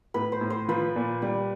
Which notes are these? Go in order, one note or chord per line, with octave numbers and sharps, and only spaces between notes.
A2 B4
C5
A2
C5
F3 B4
A#2
G3 B4